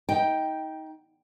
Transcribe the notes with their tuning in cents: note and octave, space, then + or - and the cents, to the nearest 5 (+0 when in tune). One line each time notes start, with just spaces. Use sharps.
D#4 +25 G5 +0